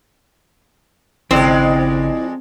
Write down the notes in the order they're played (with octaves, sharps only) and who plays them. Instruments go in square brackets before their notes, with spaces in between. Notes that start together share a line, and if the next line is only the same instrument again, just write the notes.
[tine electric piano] G#1 C#3 [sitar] F2 G#3 D5 [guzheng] C4 [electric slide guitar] E4 G5